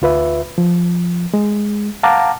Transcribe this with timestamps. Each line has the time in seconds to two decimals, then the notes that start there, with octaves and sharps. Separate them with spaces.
0.02 D2 F4 B4 E5
0.58 F3
1.34 G#3
2.03 F5 F#5 A5 A#5 D6